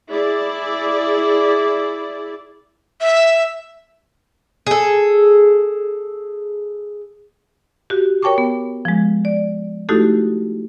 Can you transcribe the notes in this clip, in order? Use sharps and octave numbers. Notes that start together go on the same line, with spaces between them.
E4 G#4 D5
E5
G#4 A4
F#4 G4
A#4 C#5 G5 A5 C#6 D6
B3
F3 G#3
D5
A3 D#4 E4 F#4 G4 A4